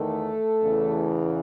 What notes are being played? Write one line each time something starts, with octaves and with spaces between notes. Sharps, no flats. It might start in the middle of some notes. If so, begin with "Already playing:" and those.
Already playing: E2 D#3 A3 A4
E2 C#3 E3